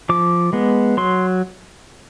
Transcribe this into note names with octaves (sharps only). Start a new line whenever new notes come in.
F3 D6
G#3 B3
F#3 C6